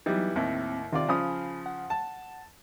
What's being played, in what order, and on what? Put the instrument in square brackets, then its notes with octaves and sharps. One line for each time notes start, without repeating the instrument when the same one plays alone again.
[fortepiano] E3 G3 B3 [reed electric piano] F#3 D#4
[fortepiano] D#2 A2 [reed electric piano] C4
[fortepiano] C3 F4 D5 [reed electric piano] D#3
[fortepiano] C#3 F3 D#6 [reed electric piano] G#5 B5 F6
[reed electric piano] F#5
[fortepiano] A5